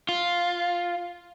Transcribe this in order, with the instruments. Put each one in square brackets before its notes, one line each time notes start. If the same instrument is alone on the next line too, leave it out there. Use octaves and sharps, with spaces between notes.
[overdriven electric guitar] F4